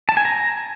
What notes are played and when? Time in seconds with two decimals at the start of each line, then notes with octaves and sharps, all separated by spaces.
0.09 A5
0.17 G#5
0.25 A#5